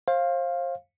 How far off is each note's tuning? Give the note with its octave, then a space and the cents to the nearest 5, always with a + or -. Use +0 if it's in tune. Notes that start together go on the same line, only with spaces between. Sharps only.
C5 +35 F5 +0